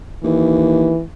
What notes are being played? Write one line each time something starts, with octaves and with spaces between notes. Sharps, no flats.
D#2 E3